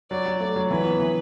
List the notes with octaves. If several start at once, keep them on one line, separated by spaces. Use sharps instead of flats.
F#3 D5
F#3
A3 D5
F#3
E3 B4
B3
E3